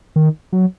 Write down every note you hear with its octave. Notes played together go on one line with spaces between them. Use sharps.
D#3
F#3